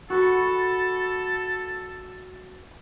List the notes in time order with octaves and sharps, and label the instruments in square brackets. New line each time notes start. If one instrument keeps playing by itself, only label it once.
[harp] F#4 B5 [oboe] A4